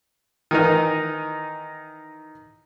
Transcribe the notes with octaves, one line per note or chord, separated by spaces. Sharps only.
D#3 E3 D#4